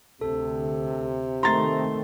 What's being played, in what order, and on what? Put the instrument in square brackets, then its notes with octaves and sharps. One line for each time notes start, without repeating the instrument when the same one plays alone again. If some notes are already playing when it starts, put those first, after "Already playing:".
[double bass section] D2 [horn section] C3 [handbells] A4
[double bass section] D#3 A3 C4 [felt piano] A#5 A6 [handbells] C6